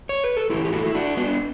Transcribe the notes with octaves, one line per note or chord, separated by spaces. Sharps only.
C#5
B4
A4
A2 E3 E4 G4
G4
F#4 A4
E4
D4 F#4
B3 D4